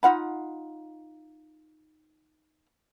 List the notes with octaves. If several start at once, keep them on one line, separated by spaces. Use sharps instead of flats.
D#4 F4 F#5 B5